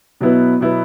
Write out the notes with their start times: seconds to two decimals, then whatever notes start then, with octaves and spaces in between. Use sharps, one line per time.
0.21 B2 F#3 B3 E4 B4
0.60 B2 F#3 B3 E4 B4